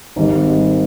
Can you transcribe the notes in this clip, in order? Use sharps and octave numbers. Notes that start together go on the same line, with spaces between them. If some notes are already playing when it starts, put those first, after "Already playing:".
G#1 G#2 D#3 G3